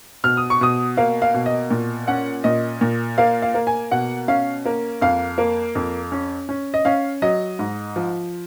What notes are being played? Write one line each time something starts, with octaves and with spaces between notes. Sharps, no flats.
B2 F6
D#6
C#6
B2 D#6
A#3 F5
F5
B2
D#5
A#2
C#4 F#5
A#2 D#5
A#2
A#3 F5
F5
A#3
G#5
B2 F#5
C#4 F5
A#3
F2 F5
A#3
F2
C#4
C#4
D#5
C#4 F5
F#3 D#5
G#2
F3